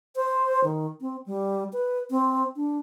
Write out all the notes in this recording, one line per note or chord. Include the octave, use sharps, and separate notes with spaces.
C5
D#3
C4
G3
B4
C4
D4